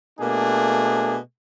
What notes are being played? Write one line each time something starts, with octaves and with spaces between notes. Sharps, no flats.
B2 A3 A#3 D4 G#4